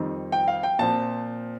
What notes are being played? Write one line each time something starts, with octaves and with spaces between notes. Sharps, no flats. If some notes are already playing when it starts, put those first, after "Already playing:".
Already playing: F2 D#3 G3 C4 D#4
G5
F5
G5
A#2 F3 C4 A5